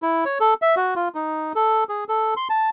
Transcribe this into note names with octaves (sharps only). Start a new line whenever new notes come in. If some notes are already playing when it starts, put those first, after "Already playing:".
E4
C#5
A4
E5
F#4
F4
D#4
A4
G#4
A4
C6
A5